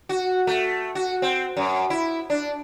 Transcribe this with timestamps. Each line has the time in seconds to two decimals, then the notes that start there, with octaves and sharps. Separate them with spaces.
0.09 F#4
0.47 A3
0.95 F#4
1.22 C4
1.57 F#2
1.90 E4
2.30 D4